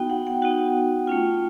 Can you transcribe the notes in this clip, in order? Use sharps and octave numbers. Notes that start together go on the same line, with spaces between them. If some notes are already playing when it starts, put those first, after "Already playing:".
Already playing: B3 D#4 F#4 G5
F#5
G5
B3 D#4 F#4 F#5
A3 C#4 F4 G5